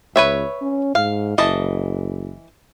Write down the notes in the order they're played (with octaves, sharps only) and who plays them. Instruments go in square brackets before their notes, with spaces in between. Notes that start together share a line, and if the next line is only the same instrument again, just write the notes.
[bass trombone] C#2 [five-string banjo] B4 C#5 E5
[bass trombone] C#4
[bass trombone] G#2 [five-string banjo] F5
[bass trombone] F#1 [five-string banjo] E3 D#5 A5